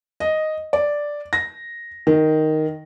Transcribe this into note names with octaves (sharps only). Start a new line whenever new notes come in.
D#5
D5
A#6
D#3